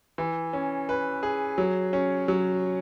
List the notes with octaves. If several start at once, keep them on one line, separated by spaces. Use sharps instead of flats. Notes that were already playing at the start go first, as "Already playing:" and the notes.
E3
C#4
B4
G#4
F#3
C#4
F#3